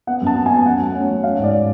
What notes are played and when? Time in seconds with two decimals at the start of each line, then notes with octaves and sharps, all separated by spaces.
0.07 B3 F#5
0.21 F#2
0.27 A5
0.36 B3
0.46 G#5
0.51 B3
0.65 F#3 F#5
0.80 A3
0.94 C#4
1.09 F#3
1.24 C#4 F5
1.39 G#2
1.44 D5